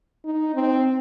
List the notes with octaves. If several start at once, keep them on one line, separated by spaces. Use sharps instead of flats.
D#4
C4